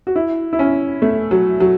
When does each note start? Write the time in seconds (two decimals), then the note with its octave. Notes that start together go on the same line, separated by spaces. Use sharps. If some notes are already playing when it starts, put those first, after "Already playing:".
0.07 F#4
0.16 E4
0.53 E4
0.59 C#4
1.02 A3
1.31 F#3
1.60 F#3